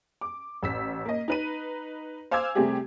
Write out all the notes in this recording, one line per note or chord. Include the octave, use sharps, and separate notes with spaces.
D6
A1 E6 B6
A#3 D#5
D#4 B4 D#7
C5 F5 G#5 D6 E6 G#6
C3 G3 A3 C4 G4 G#4